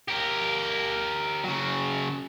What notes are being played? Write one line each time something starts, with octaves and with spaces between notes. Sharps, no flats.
G4 A#4
C#3 F#3